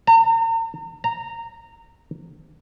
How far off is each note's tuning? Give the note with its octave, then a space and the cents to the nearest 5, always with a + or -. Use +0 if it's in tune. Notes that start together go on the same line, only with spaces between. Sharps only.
A#5 -40
A#5 -15